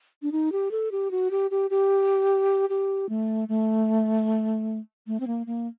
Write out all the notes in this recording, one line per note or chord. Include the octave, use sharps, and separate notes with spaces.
D4
D#4
G4
A4
G4
F#4
G4
G4
G4
G4
A3
A3
A3
C4
A#3
A#3